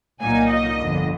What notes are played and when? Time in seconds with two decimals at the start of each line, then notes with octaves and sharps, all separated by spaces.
0.21 C2 A#2 F#3 A#3 D#4 G#5
0.49 D#5
0.77 G1 F2 D3